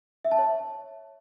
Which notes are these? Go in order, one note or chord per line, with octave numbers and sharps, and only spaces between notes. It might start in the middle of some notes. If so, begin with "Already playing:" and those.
E5
A5
C#5